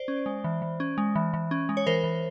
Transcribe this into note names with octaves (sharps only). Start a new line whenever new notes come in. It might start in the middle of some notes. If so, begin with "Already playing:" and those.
Already playing: C5 D5
C#4
G#3
E3
E3
C#4
G#3
E3
E3
C#4
G#3
C#5
E3 A#4 C5
E3